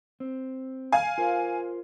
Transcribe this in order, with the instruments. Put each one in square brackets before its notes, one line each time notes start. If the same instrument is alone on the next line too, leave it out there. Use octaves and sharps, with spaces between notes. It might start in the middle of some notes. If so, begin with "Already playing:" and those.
[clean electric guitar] C4
[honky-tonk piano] F5 G#5
[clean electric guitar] F4 A#4 C5